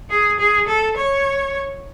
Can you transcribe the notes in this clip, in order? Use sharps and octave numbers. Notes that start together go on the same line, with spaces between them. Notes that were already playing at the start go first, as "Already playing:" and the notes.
G#4
G#4
A4
C#5